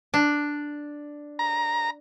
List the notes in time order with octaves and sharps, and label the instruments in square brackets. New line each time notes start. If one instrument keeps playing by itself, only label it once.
[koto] D4
[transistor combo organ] A#5